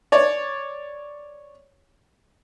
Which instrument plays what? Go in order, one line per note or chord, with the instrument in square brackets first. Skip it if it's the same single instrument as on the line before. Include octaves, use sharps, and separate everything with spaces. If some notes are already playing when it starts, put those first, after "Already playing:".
[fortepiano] C#5 D5